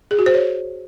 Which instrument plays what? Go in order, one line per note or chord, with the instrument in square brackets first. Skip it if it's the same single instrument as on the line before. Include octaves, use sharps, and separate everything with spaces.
[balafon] G#4
F#4
C5
C#5